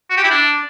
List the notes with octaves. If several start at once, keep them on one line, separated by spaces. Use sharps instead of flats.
F#4
G4
E4
D4